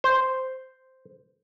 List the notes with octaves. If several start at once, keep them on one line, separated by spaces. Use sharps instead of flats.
C5